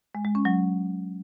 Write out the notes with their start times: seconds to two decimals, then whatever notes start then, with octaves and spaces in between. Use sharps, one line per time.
0.15 G#3
0.25 G#3
0.35 C#4
0.45 F#3